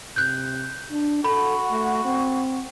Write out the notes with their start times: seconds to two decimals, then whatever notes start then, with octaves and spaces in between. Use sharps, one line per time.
0.16 C3 F#6 G6
0.91 D4
1.24 F#4 A4 B5
1.71 A3
2.05 C4